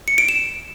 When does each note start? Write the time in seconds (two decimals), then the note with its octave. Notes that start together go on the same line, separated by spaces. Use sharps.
0.08 C#7
0.18 D7
0.29 E7